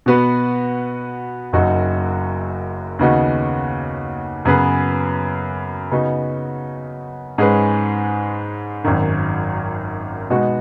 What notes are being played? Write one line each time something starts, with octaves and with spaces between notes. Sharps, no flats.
B2 B3 F#4 B4
F#1 F#2 F#3 D#4 F#4
D#2 C#3 B3 D#4 F#4
F#2 C#3 B3 G#4 B4
C#3 B3 D#4 F#4
G#2 G#3 C#4 G#4 B4
G#1 F#2 D#3
B2 G#3 B3 D#4 F#4